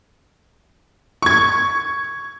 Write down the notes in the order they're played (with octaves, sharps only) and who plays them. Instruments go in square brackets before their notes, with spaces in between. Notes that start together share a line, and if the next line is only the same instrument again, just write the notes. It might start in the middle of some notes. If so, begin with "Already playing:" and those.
[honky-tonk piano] C#6 G#6